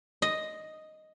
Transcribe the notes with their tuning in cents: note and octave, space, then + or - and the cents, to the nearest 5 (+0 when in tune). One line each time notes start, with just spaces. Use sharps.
D#5 +0